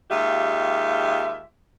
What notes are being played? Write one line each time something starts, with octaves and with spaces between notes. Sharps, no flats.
D#2 G#3 F4 G4 E5